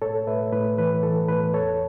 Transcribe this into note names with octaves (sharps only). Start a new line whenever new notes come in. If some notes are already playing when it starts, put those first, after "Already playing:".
A2 A4 C#5
A2 B4 E5
A2 B4
E3 B4
E3 A4
A2 B4
E2 A4 C#5